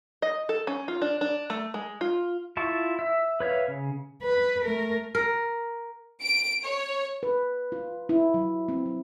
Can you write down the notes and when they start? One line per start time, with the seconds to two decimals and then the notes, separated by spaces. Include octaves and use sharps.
0.22 D#5
0.49 A4
0.67 C#4
0.88 F4
1.02 D4
1.21 D4
1.50 A3
1.74 G#3
2.01 F4
2.57 E4 F4 A5 C#6
2.99 E5
3.40 B4 C#5 E5 F5
3.68 C#3
4.23 B4
4.65 A3 A#4
5.15 A#4
6.22 D7
6.63 C#5
7.23 B4
7.72 F4
8.09 E4
8.34 F#3
8.69 C4
8.86 F#3